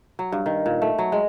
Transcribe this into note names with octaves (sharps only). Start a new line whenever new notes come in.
F#3
G2
D#3
A#2
A3
F#3
G#3